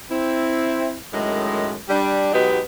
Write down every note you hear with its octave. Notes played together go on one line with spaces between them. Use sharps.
C4 E4
F#2 A2 D#3 G#3
G3 D4
B2 F#3 G#3 B3 D#4 G4